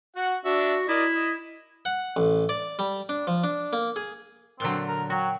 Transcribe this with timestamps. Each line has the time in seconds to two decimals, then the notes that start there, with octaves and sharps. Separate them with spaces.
0.16 F#4 F#5
0.45 D4 F#4 E5
0.88 E4 A#4 D5 D#5
1.14 D#5
1.85 F#5
2.17 A1
2.49 D5
2.79 G3
3.09 D4
3.27 F3
3.44 D4
3.73 A#3
3.96 G#4
4.60 A#2 D3 F#3 C4 F#6 G7
4.88 A#4
5.10 F#3 F#4 G5